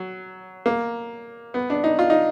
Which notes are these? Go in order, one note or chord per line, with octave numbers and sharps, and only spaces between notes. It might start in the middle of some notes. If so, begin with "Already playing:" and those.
Already playing: F#3
A#3
B3
D4
D#4
F4
D#4